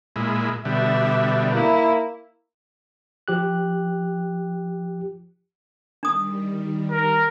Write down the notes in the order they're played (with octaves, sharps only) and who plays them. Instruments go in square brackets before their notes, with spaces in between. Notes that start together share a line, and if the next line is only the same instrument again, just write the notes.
[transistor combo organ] A#2 G#3 E4
[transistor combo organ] B2 D3 G3 [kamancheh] E5
[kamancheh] A#3 E4
[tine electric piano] F3 G4 F#6
[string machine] D#3 G3 [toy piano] D4 D#6
[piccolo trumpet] A#4